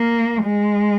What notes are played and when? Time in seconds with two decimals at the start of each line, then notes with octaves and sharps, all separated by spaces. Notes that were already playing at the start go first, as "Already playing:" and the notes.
Already playing: A#3
0.42 G#3